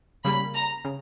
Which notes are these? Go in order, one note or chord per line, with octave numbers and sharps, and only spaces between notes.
C#3 G3 A#3 B5
A#5
C#3